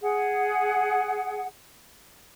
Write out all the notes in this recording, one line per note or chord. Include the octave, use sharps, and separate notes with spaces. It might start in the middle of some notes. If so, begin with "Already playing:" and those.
G#4 F#5